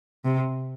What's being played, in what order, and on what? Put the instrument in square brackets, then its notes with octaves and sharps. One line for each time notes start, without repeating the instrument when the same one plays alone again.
[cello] C3